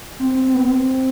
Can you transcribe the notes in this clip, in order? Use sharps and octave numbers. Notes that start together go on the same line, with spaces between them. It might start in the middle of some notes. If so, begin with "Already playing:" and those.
C4
C4
C4
B3
C4